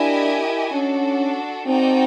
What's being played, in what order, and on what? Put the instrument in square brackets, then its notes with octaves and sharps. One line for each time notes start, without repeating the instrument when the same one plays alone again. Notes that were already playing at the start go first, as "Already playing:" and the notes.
Already playing: [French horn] D4 [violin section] E4 G4 A#4 D#5 G#5
[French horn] C#4 [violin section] D4 F#4 A4
[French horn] C4 [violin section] D#4 F#4 A4 D5 G5